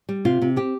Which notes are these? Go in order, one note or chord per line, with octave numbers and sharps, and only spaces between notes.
G3
C3 F4
C3
C4 G4